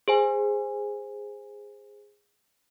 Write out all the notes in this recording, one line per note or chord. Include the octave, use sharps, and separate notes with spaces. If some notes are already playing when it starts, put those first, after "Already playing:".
G#4 C5 G#5